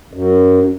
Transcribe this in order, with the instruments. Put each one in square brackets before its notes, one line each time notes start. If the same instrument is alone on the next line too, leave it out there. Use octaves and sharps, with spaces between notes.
[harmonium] F#2